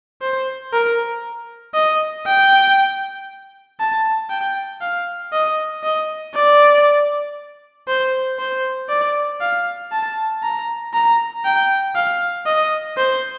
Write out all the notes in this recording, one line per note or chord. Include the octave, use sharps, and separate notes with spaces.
C5
A#4
D#5
G5
A5
G5
F5
D#5
D#5
D5
C5
C5
D5
F5
A5
A#5
A#5
G5
F5
D#5
C5